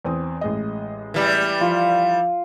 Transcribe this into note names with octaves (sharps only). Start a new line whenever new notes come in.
E2 C4 D#6
A1 G#3 D#5
E3 G3
F3 F4